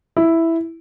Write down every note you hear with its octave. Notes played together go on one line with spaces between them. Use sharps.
E4